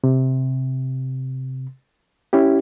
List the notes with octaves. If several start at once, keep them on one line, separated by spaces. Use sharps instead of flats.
C3
C#4 E4 G4